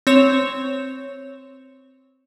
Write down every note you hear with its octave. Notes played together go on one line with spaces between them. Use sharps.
C4 C#5 E7